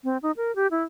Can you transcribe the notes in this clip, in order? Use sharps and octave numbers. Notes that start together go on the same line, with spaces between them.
C4
D#4
A#4
G4
E4